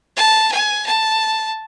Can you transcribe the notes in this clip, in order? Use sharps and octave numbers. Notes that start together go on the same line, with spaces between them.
A5
G#5
A5